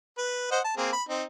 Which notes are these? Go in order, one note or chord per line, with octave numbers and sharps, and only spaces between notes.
B4
C5 D#5 F#5
A5
A#3 C4 G#4
B5
C4 D#4